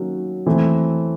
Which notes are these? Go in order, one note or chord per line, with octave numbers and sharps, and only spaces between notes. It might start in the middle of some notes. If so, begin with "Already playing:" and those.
Already playing: D#3 F#3 A#3 C#4
E3 A3 C4